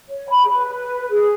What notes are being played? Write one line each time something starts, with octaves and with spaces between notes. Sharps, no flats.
C#5
B5
G#4
B4
G#4